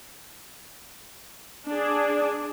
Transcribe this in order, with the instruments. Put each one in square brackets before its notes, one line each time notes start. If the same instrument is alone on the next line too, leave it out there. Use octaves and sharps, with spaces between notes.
[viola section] D4 G#4